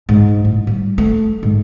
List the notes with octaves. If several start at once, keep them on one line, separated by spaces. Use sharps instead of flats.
G#2
A2
G3
A3
G#2